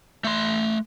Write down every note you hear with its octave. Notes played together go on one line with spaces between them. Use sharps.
A3 C6